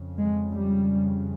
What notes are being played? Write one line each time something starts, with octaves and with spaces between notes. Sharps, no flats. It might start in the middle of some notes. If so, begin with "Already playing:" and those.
Already playing: F2 C#3
G#3
G3